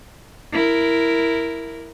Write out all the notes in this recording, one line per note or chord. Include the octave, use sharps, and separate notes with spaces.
E4 A#4